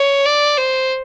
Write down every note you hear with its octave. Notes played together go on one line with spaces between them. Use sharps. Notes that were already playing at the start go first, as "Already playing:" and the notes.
Already playing: C#5
D5
C5